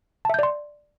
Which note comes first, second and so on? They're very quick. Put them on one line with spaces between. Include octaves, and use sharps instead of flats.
A5 E5 G6 D5 C6